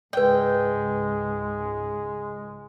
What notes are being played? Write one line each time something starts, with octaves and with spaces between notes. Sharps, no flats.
C#2 G#2 G#3 B4 D5 G5